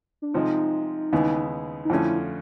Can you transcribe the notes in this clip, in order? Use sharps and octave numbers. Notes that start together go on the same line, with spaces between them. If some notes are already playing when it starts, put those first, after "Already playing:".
D4
C3 F3 G#3 D#4
D#2 C#3 E3 G#3 B3
D#4
F2 D3 F3 A3 C#4 E4